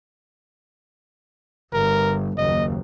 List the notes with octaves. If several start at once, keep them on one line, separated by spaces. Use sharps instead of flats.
G1 A#4
F#1 D#2 D#5